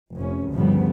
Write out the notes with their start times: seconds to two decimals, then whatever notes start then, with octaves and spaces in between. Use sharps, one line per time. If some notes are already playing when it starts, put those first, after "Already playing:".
0.15 F1 C#4
0.52 D2 G2 C#3 F3 G3 B3